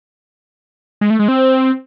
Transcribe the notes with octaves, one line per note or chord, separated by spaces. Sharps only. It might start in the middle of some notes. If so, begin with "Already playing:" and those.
G#3
A3
G#3
C4